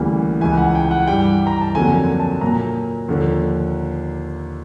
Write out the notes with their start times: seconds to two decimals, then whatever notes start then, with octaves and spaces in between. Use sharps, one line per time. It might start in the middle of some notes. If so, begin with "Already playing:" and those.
Already playing: D2 C#3 E3 G3 A#3
0.41 C#2 C#3 E3 G#5
0.58 F#5
0.75 G5
0.91 F#5
1.08 G2 E3 G3 G5
1.47 A#5
1.61 A5
1.75 F2 D3 F#3 A#3 G#5
1.97 G#5
2.19 A5
2.41 A#2 F#3 A#3 A#5
3.08 D#2 D3 F3